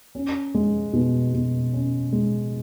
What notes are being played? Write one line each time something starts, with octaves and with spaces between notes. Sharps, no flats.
C#4
G#3
B2
B2
C#4
G#3